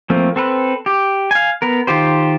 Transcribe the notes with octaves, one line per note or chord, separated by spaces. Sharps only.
F3 A3 A#3 C4
C4 A4 B4
G4
F5 G#5
B3 A#4
D#3 F4 G4 C5